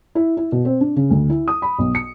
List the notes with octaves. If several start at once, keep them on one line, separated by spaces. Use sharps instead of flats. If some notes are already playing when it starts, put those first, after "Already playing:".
E4
E4
B2
C4
D4
C#3
D2
E4
D#6
B5
B1
C#7